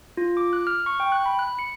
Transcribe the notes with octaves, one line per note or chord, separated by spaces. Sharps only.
F4
D6
F#6
F6
C#6
G5
F#6
B5
F#6
C#7